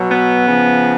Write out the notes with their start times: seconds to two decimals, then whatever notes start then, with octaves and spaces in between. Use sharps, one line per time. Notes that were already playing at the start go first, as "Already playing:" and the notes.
Already playing: B2 F#3
0.11 B3
0.47 C#3 F3